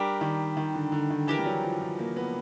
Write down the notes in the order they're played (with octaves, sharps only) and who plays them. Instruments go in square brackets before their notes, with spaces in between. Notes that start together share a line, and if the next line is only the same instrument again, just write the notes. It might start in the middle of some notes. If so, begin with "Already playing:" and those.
Already playing: [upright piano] G3 [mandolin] D4 G4 A#4
[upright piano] D#3
D#3
D3
D3
D#3
[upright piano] E3 [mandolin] D4 G4 A#4
[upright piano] G3
F#3
F3
F3
A#3
B3